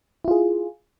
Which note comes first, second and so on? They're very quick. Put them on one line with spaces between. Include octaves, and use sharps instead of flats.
E4 F4 G#4